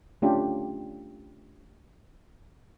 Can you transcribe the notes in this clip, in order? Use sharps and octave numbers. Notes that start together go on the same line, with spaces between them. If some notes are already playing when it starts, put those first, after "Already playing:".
A3 C#4 D4 F4 G4